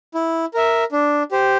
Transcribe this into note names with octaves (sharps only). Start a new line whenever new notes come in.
E4
A#4 E5
D4
G4 C5